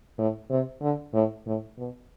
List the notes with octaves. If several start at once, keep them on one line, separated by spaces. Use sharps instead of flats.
A2
C3
D3
A2
A2
B2